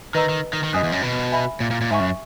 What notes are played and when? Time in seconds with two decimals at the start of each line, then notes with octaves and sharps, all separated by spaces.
0.15 D#3 B4 D#5 A#5 E6
0.29 D#3
0.53 D#3
0.64 D#3
0.73 F#2 D#5 G#5 D#6 F#6
0.83 E2
0.92 F#2
1.02 B2
1.32 E5 G#5 B5
1.60 A#2
1.71 A#2
1.81 A#2
1.91 G#2 E5 G#5 C#6
2.00 F#2